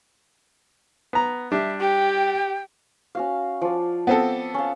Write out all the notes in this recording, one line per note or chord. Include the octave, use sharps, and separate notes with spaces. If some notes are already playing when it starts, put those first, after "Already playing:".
B3 A#5
G3 D4 E5
G4 G5
C#4 F#4 F5
F3 D5
B3 C4 A4
C#4 F5